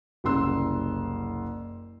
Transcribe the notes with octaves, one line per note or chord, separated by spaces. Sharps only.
F#1 C2 C#4 C6 E6